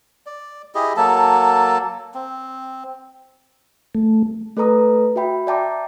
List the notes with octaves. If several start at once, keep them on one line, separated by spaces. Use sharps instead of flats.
D5
E4 G4 G#4 D#5
F#3 A#3 A4 A5
C4
A3
A3 A4 B4 A#5 D#6
F#4 E5 G5 B5
D5 E5 G5 A5 A#5 D6